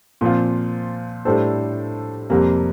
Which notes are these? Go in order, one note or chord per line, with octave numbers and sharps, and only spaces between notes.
A#2 F3 C4 F4
A2 G3 D4 A4 C5
F2 C3 G3 A#3